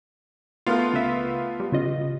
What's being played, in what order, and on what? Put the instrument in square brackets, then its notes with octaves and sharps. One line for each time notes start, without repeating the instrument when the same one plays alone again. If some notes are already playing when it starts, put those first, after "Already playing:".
[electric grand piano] A3 B3 F4 [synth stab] A#4 F5
[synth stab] C#2 E5
G3
C#3 F4 D#5